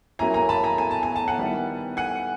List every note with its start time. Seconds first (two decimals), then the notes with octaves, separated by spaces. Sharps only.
0.19 F#3 A#3 C#4 E4 G#5 A#5
0.34 G#5 A#5
0.49 A5 B5
0.64 G#5 A#5
0.78 G#5
0.91 A5
1.03 G#5
1.16 A5
1.28 F#5 G#5
1.38 D#3 G3 B3 E4
1.97 F#5 G#5